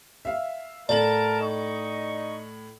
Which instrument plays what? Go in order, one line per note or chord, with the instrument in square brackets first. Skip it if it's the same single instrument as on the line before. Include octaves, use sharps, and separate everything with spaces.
[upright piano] E5 F5
[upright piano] A2 A3 F#7 [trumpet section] A#4 A5 [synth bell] D5
[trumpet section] D#4 D#5 C#6